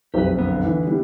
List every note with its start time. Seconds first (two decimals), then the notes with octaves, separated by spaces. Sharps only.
0.14 F#1 B1 F2 G4 B4
0.39 D3 B3
0.65 E3
0.87 G3 E4